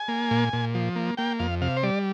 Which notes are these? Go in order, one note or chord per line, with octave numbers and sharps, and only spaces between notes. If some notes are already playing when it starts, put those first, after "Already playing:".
Already playing: G#5
A#3
A#2
A#2
F3
A#3
A#3 G5
F2 F5
C3 F5
C5
G3 D5